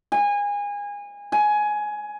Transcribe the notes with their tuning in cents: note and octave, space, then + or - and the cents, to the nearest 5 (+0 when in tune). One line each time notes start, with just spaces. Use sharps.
G#5 -25
G#5 +15